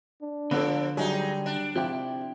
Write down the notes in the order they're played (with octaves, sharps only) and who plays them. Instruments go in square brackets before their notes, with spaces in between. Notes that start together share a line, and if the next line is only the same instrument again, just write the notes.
[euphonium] D4
[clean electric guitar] D3 [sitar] F3 [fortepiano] B3 A4
[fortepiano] F#3 [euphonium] G3 [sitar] D#4 G#4
[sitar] D4
[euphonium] C3 [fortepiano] F3 G5 [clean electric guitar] C4 E4 G4